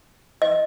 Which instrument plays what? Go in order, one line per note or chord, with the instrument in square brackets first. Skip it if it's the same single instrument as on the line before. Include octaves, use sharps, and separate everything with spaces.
[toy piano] D#5